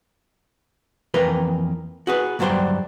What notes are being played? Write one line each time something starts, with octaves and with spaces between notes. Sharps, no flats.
F2 E3 A#3 A#4 B4 G5
F#4 G#4 B4
D2 G2 F#3 G3 C5 G5